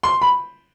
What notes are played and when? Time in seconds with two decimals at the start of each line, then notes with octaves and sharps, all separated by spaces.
0.03 C6
0.22 B5